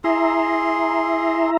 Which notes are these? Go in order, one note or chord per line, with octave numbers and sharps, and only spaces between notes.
E4 G#4 E5 A#5 C6